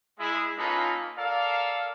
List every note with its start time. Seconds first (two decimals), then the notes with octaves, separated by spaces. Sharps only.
0.19 G#3 E4 G#4
0.57 A#3 C#4 D#4 F4 A4 B4
1.17 A4 A#4 D5 F5